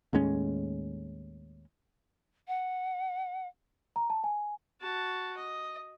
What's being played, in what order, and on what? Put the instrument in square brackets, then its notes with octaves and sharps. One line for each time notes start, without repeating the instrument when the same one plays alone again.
[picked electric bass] D#2 A2 G#3 C#4
[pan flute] F#5
[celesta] A#5
A5
G#5
[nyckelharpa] F#4 A5
D#5